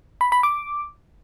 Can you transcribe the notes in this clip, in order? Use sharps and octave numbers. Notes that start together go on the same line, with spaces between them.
B5
B5
D6